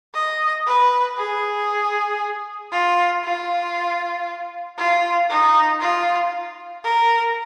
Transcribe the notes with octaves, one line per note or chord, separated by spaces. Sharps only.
D#5
B4
G#4
F4
F4
F4
D#4
F4
A#4